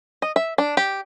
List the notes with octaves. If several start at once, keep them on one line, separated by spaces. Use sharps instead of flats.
D#5
E5
D4
G4